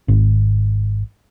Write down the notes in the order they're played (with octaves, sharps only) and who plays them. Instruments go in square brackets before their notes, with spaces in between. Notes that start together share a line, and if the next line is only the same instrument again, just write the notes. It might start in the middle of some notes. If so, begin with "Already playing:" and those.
[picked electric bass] G#1